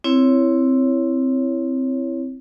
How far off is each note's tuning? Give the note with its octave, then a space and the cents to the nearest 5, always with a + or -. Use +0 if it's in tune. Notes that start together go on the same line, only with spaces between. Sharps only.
C4 +0 E4 +5 C#5 +0